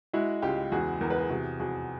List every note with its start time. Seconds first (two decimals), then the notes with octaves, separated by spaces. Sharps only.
0.13 G#3 E4 F#4
0.42 C#2 F4 G4
0.72 E2 F#4 G#4
1.01 E2 A#4
1.10 B4
1.19 G#4 A#4
1.30 C3 F#4 G#4
1.59 F2 F#4 G#4